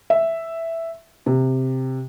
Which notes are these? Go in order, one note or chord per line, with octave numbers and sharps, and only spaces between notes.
E5
C3